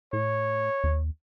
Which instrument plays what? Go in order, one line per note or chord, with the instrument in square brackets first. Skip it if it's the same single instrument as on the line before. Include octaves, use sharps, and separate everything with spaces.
[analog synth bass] A2 [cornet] C#5
[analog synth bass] D#2